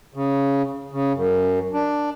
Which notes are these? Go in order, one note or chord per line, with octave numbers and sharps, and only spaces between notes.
C#3
C#3
F#2
D4